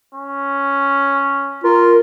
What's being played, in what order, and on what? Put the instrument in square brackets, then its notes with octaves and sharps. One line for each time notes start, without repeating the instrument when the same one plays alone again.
[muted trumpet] C#4
[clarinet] F4 [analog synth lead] A#4